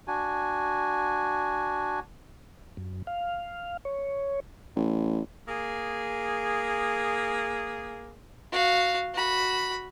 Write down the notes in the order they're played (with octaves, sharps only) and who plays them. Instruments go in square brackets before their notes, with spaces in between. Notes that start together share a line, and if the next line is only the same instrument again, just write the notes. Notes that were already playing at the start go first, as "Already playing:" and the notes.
[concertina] D4 F#4 G#5
[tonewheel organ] F#2
F5
C#5
[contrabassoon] A1
[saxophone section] A#3 G#4
[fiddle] F#4 F5
F#4 B5